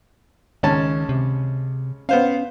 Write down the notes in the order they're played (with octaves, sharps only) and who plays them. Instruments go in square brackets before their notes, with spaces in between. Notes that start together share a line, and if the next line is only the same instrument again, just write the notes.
[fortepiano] C#2 C#4 A5 [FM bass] D#3
[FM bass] C3
[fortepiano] B3 C5 F5 [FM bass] C#4